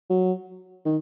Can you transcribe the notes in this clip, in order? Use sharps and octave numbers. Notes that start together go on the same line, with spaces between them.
F#3
D#3